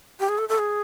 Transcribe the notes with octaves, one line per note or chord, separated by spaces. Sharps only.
G4
G#4
A4
A4
G#4